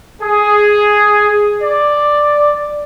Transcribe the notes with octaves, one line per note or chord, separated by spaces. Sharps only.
G#4
D5